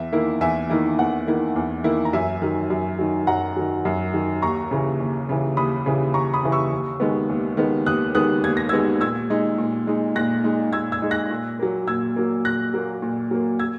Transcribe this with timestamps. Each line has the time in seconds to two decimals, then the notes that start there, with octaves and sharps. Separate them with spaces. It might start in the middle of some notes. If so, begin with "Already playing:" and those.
Already playing: E2 E5
0.12 D#3 A#3 E4
0.41 E2 E5 G#5
0.70 D#3 A#3 E4
0.99 E2 F#5
1.28 D#3 A#3 E4
1.56 E2
1.84 D#3 A#3 E4
2.05 A#5
2.13 F#2 E5 G#5
2.42 D#3 F#3
2.70 F#2
2.99 D#3 F#3
3.27 F#2 F#5 A#5
3.56 D#3 F#3
3.85 F#2
4.14 D#3 F#3
4.42 D#2 A#5 C#6
4.71 C#3 E3
5.00 D#2
5.29 C#3 E3
5.57 D#2 B5 D#6
5.86 C#3 E3
6.14 D#2 A#5 C#6
6.34 B5 D#6
6.43 C#3 E3
6.52 C#6 E6
6.72 D#2
7.00 D#3 G#3 B3
7.29 D#2
7.57 D#3 G#3 B3
7.86 D#2 D#6 F#6
8.15 D#3 G#3 B3 D#6 F#6
8.44 D#2 G#6
8.57 A#6
8.69 D#3 G#3 B3 E6 G#6
9.01 A#2 E6 G#6
9.30 G#3 D#4
9.58 A#2
9.87 G#3 D#4
10.16 A#2 F#6 A#6
10.44 G#3 D#4
10.73 A#2 E6 G#6
10.92 E6 G#6
11.02 G#3 D#4
11.11 F#6 A#6
11.31 A#2
11.59 F#3 A#3
11.87 A#2 E6 G#6
12.16 F#3 A#3
12.45 A#2 F#6 A#6
12.74 F#3 A#3
13.02 A#2
13.31 F#3 A#3
13.59 E6 G#6